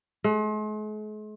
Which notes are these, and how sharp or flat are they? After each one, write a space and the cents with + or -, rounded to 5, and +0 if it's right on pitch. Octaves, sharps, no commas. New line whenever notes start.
G#3 +45